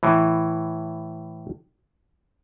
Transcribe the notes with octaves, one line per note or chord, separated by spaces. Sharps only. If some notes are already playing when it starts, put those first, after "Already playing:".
A2 E3